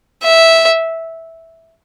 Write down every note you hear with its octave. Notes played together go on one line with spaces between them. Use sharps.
E5